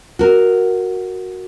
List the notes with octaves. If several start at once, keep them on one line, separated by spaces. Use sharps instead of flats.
F#4 A#4